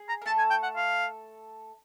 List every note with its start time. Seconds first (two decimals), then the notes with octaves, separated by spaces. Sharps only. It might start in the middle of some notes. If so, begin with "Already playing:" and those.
Already playing: G#4
0.09 A#5
0.22 A#4
0.26 A3 A4 A5
0.38 G#5
0.51 G5
0.63 F#5
0.76 F5